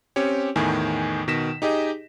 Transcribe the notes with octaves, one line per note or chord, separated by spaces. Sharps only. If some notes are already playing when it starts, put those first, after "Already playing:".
C4 C#4 G4 C#5
E2 A2 D#3 G#5
B2 D#3 A#6 B6 E7
D#4 G4 G#4 D#5